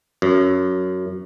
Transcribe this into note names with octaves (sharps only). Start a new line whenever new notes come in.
F#2